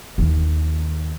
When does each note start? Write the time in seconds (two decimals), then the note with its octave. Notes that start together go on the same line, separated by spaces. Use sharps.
0.18 D#2 D#3